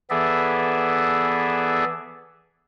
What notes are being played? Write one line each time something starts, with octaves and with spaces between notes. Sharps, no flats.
E3 B3 G#4 A4 D5 E5